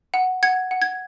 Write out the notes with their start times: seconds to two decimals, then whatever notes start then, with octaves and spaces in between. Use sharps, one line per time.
0.14 F#5
0.43 F#5 G#6
0.71 F#5
0.82 G#6